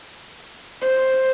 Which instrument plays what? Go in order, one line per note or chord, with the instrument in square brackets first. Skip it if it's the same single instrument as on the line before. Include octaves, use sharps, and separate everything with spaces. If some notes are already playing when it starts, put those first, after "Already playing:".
[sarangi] C5